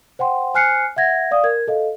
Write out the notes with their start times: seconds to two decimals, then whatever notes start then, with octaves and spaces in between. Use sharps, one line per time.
0.19 C5 F#5 G5 C6
0.54 C5 G#5 F6 F#6 C7 C#7
0.96 E5 F#5 G#6 A#6
1.31 D5 F5 D#6
1.44 A#4 G#6
1.67 A4 D#5 F5